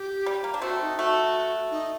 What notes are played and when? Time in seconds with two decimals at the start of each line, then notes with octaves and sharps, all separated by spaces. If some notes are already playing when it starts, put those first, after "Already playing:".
Already playing: G4
0.26 G3
0.44 A#3
0.54 D4
0.62 A3 C4 F#4
0.81 D#4
0.98 A3 F#4
1.71 D#4